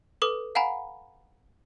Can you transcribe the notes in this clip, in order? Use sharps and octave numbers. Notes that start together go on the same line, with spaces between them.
A4 B4 D6 D#6
F5 F#5 G#5 A#5 B5